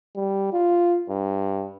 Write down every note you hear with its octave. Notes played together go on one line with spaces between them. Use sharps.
G3
F4
G2